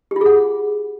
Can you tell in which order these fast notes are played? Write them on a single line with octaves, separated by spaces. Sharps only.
G4 F4 G#4 F#5